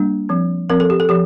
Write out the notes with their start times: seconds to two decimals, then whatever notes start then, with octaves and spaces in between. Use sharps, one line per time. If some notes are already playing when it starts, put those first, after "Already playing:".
Already playing: G3 A#3 D4
0.29 F3 C4
0.70 F3 C4 A#4
0.80 A4
0.90 G4
1.00 A4
1.09 F3 G4